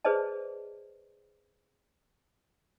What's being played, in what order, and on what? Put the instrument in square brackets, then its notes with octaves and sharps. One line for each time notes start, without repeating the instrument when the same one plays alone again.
[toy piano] G#4 B4 C5 D5 D#5 A5